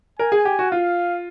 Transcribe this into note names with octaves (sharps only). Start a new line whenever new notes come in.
A#4 G#5
G#4
G4
F#4
F4 F5